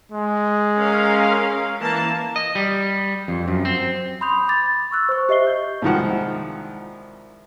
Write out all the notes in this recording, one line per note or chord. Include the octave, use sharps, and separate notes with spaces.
G#3
C#4 A#4 F5
E3 A#3 A5
D#5
G3
F2
F#2
C4
B5 C6 D#6 G6 F7
B5 D6 A6
C#6 E6 F#6 A6
C5 C#6
G4 D#5 E5 C7 G7
G6
C2 G#2 D#3 F3 F#5